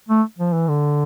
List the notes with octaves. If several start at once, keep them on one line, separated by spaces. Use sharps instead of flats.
A3
F3
E3
D3